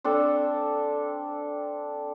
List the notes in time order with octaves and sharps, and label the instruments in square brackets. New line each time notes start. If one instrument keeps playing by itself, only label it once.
[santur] C4 D4 A4